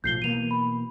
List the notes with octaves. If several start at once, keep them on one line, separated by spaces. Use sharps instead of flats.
B1 A2 F3 G6 C7 G7
B2 E3 A#3 D#7 F7
B5